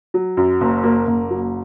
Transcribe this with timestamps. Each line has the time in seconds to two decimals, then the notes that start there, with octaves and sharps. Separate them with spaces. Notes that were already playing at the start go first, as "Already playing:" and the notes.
0.14 F#3
0.37 F#2
0.61 F#1
0.83 A#3
1.07 F#1
1.30 F#3